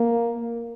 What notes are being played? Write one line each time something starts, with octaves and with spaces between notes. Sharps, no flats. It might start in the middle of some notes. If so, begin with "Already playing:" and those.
Already playing: A#3